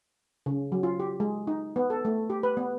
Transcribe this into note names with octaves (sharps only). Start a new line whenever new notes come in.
C#3
F#3
F4
G4
G#3
D#4
B3
A4
A3
G4
B4
B3